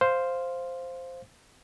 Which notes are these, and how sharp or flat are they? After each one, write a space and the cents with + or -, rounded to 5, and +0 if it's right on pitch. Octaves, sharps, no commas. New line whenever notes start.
C5 +0 F5 +0